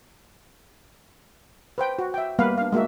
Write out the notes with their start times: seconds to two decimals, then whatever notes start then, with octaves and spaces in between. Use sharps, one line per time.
1.78 B4 C5 G5
1.99 F#4
2.14 E5 G5
2.39 G3 A#3 B3 B4 F5 F#5
2.58 D4 F5
2.72 G#3 A#3 F#4 E5